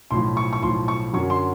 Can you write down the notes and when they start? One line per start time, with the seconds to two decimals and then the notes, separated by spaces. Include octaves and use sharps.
0.11 B1 A2 F3 C6
0.37 C#6
0.53 C#6
0.62 B1 A2 F3 C6
0.88 C#6
1.13 F#2 D3 F#3 C#6
1.30 C6